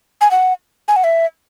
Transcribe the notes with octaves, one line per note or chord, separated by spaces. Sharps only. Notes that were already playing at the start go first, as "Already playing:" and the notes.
G#5
F#5
G#5
F#5
E5